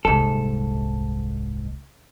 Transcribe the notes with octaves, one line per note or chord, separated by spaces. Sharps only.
D#1 C2 G#2 A4